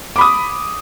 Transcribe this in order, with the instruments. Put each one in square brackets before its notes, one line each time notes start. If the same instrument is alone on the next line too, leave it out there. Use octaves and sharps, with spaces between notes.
[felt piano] D6
B5
D#6